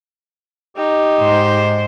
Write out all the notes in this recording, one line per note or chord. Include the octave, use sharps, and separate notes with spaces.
D#4 G4
G#2 C5